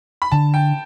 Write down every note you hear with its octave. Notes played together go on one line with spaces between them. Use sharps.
B5
D3 A5
G5